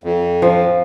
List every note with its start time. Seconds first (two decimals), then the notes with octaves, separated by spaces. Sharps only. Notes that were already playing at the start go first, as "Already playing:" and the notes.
0.04 F2
0.42 F3